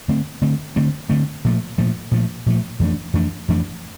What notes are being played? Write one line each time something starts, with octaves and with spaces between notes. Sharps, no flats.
D3 A3 C4
D3 A3 C4
D3 A3 C4
D3 A3 C4
A#2 F3 A3
A#2 F3 A3
A#2 F3 A3
A#2 F3 A3
F2 E3 A3 D4
F2 E3 A3 D4
F2 E3 A3 D4